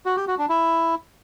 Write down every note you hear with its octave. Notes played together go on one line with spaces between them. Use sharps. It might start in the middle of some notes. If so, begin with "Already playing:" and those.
F#4
G4
F#4
D4
E4